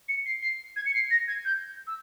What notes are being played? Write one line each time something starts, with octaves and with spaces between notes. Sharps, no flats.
C#7
C7
C7
G#6
C#7
C7
A#6
G#6
G6
E6